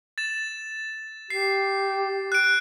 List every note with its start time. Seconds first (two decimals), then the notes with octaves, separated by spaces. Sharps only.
0.18 A6 E7
1.30 G4 C7
2.32 F#6 D7